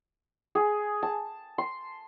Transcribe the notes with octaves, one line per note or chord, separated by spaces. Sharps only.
G#4
A5
C6